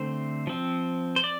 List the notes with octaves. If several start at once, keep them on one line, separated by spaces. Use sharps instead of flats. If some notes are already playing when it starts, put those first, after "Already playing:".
Already playing: D3 A3 C4 C5
F3 C4
C5
D5